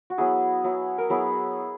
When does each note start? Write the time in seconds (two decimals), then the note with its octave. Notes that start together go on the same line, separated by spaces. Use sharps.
0.10 F#4
0.18 F#3 B3 E4 G#4
0.64 F#3 B3 E4
0.98 A#4
1.10 F#3 B3 E4 G#4